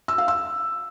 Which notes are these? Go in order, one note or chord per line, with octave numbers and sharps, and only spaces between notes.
E6
F5
E6